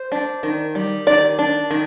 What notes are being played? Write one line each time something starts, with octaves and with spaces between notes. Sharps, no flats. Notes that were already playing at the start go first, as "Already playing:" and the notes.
Already playing: C5
D4
D#3
G3
D#3 D5
D4
D#3